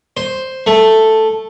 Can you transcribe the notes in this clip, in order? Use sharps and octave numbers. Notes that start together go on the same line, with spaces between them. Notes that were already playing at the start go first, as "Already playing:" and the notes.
C5
A3